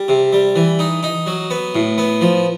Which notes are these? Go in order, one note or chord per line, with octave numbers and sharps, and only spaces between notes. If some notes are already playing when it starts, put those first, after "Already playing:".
Already playing: G3
C3
G3
E3
D#4
D#4
F#3
B3
A2
B3
F3